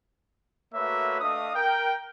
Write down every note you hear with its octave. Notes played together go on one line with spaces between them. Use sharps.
A3 A#3 F#4 B4 C#5 E5
A3 D4 D#5 F5 D#6
A#4 G5